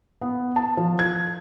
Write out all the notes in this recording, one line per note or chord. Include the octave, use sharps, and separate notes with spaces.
B3
A5
F3
G#6